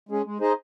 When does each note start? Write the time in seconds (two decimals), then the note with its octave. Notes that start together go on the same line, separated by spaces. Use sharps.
0.09 G#3 C#4 G#4
0.25 G#3
0.40 D#4 G#4 C5 D#5